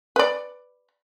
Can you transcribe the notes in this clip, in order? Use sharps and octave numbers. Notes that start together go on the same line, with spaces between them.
B4 D5